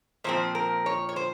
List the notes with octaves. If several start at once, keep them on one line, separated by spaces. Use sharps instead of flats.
A#2 F3 C4 C5
A#4
C#5
C#5
C5